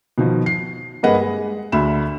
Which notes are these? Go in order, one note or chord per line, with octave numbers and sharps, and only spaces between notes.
B2 D#3 F3
C7
G2 A#3 G#4 B4 D#5 F#5
G#3
D2 D4 E5 B5 E7